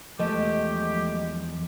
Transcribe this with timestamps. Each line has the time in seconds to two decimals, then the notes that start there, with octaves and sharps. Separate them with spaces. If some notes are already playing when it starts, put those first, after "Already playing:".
0.19 E2 F3 G#3 A3 G4 D#5